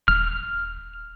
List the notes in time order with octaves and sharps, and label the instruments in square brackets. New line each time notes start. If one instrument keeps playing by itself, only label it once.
[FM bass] D#1 [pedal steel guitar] F6